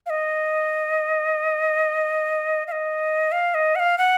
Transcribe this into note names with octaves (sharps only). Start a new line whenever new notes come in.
F5
D#5
F5
D#5
F5
D#5
F#5
F5
F#5